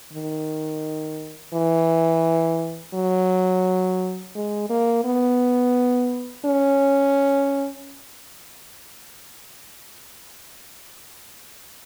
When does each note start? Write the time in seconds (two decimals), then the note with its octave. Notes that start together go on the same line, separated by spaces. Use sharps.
0.13 D#3
1.53 E3
2.94 F#3
4.35 G#3
4.69 A#3
5.05 B3
6.45 C#4